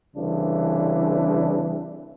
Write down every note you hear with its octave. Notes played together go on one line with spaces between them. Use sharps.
C2 C#3 E3 D4